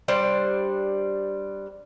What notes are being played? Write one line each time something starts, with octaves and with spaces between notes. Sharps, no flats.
G3 D4 C5